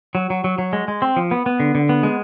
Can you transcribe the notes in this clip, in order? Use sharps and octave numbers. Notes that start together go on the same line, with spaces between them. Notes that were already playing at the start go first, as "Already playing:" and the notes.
F#3
F#3
F#3
F#3
G#3
G#3
C4
F3
B3
B3
D3
D3
B3
G#3